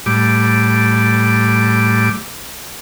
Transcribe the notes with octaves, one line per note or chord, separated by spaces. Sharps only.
A2 G3 D6